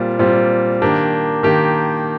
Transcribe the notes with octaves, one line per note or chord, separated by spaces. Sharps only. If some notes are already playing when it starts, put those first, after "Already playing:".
Already playing: A#2 G3 C4 F4
A#2 G3 C4 F4
D#3 A#3 D4 G4
D#3 A#3 D4 G4